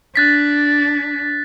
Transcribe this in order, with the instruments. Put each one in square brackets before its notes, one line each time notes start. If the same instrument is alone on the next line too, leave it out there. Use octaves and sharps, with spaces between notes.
[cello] D4 [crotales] F#6 A6 B6